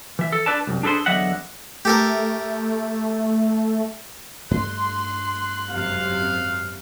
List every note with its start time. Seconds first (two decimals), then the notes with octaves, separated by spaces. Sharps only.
0.19 E3 E5
0.32 A4
0.46 D4 B4 D5 A5
0.67 C2 F#2
0.83 D4 G#4 A4 B4 C5
1.06 E2 D3 F#3 D#5 E5 F#5
1.85 A3 G4 A4 A#4
4.51 G2 G3 A3 C6 F#6
5.71 G#1 F#2 C3 F5